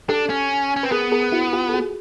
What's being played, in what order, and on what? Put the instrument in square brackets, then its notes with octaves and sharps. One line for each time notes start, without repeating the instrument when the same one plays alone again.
[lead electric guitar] D4 [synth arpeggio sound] G4 A4
[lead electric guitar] C#4
C#4
[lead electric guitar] C4 [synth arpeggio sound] B4
[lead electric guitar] B3 [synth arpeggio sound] G#4 A#4
[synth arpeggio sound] G#4 A#4
E4 F#4
F4 G4
A4
F#4 G#4